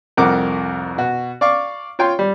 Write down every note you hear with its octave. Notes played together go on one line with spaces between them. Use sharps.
C2 F2 A#4 F#5 D6
B2 F#4
D5 F5 C#6 D6
F4 C#5 G5 C6
G3